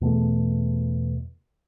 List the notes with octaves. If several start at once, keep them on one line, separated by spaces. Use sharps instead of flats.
E2 B2 A3